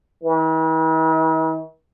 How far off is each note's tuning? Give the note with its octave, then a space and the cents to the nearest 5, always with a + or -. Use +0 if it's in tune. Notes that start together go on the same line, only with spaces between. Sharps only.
E3 -45